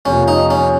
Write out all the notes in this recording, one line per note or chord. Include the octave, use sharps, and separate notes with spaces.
F2 C3 F3 A#3 C#4
D#4
C#4